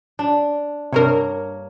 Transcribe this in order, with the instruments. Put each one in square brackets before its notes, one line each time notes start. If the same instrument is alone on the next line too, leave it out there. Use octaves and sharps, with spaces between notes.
[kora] D4
[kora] G2 A#3 C#5 [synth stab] C3 A#4